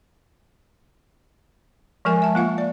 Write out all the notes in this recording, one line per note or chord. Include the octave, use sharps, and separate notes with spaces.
F3 G#3 A#4 G#5
E5 A5
A#3 F4 F5
D5